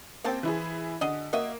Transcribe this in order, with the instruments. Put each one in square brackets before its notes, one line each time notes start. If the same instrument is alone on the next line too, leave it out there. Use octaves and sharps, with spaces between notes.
[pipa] F3 C5 A5 [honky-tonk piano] A#3 C4 G5
[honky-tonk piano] E3 E4 G#4
[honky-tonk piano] D3 [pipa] F#4 G#4 D#5
[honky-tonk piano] A#3 [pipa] F#4 D#5 E5